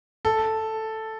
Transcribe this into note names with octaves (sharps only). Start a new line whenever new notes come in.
A4